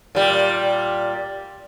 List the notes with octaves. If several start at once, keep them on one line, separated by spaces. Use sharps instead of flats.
A#2 G3